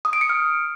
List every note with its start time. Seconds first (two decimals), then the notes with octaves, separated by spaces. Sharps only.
0.05 D#6
0.13 D7
0.21 C#7
0.29 F6